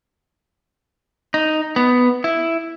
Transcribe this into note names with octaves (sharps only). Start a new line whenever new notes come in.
D#4
B3
E4